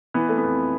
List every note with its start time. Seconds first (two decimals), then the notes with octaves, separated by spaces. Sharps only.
0.14 E3 B3
0.29 A3
0.38 B3
0.44 F2